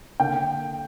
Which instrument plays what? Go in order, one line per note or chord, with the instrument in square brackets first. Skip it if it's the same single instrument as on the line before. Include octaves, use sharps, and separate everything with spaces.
[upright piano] D3 A#3 G5